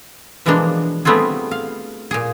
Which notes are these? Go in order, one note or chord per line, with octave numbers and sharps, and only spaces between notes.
B2 E3 F3 G#3 A#3 D4
G3 A3 B3 C4 F4 G#4
F5
A#2 G#4